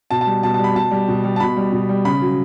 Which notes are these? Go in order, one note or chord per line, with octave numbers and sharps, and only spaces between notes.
B2 A5
A5
G3
B2 A5
A5
G3 B5
B2 A5
G3
B2
G3
A5
B2 B5
G3
B2
G3
C#3 B5
F#3